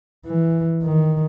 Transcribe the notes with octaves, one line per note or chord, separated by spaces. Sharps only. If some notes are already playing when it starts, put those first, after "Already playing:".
E3
D#3